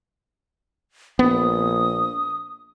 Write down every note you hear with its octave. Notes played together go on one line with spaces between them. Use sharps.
A#1 B3 D#6